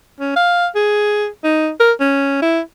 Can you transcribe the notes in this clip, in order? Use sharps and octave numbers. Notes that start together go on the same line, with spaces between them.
C#4
F5
G#4
D#4
A#4
C#4
E4